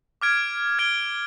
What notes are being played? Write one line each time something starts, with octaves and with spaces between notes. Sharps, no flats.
D6 F6 G#6 D7
F6 G#6 D7 G7